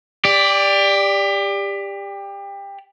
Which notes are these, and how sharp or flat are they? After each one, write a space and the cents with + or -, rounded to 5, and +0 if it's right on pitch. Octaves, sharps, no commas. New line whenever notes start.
G4 +25 D5 +0